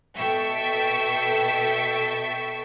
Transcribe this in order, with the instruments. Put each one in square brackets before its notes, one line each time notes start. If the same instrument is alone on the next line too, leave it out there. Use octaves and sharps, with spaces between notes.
[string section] B2 A4 E5 G5 C#6 B6